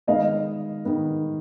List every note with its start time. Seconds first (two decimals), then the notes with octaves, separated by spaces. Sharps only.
0.07 D#3 G#3 B3 D#5 F5
0.85 D#3 G#3 B3